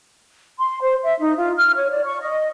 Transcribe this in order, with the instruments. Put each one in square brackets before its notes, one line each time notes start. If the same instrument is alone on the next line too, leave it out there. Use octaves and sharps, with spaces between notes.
[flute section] C6
C5
E5
D#4
F4
F6
C#5
D5
C#6
D#5